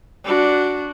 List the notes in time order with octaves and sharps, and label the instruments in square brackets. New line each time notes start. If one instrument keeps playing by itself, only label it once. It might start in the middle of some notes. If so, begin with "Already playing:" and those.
[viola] D4 F#4